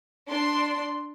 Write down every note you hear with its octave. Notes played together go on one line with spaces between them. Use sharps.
D4 C6